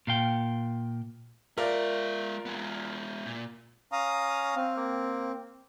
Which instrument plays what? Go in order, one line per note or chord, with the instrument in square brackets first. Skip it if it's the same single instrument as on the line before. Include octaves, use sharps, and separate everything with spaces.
[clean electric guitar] A#2 F5 G5
[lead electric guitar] G#3 E5 [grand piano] F4 A#4 D5
[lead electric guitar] G#3 B3
A#2
[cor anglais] C#4 [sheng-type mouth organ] F5 A#5 D#6
[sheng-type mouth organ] C4 [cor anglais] F5
[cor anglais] A#3